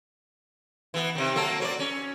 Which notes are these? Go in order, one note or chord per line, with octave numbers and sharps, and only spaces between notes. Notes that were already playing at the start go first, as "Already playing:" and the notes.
E3 B3
C3 D#3
F#3 A#3 A4
F#3 A#4 D5
C#4